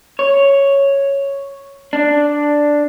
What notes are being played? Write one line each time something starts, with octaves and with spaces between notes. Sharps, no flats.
C#5
D4